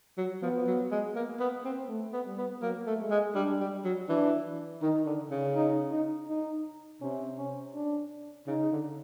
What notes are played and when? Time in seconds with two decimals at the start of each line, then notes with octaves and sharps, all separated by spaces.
0.18 F#3
0.42 F3 B3
0.67 F#3
0.92 G#3
1.16 A#3
1.40 B3
1.65 C4
1.89 A3
2.13 B3
2.26 G3
2.38 B3
2.62 F#3 A#3
2.87 A3
2.99 G#3
3.11 G#3
3.35 G3 D4
3.60 G3
3.84 F#3
4.09 E3 D4
4.82 D#3 D#4
5.06 D3
5.31 C#3
5.55 D#4
5.92 D#4
6.28 D#4
7.01 C3 C#4
7.38 C#4
7.75 D4
8.47 C#3 D#4
8.72 D3